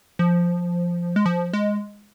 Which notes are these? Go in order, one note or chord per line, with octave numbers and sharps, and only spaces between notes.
F3
G#3
F3
G#3